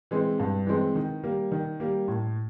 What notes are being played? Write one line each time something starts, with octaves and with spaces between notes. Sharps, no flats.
E3 G#3 C4
G2
E3 G#3 C4
D#3
G3 A#3
D#3
G3 A#3
A2